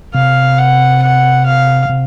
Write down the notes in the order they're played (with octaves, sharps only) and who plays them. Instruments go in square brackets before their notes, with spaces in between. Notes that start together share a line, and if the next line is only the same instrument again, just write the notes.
[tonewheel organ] C3 [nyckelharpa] F5
[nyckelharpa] F#5
F#5
F5
[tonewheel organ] C3